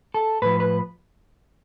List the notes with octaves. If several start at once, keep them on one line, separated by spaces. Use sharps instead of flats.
A4
A2 F3 B4
B4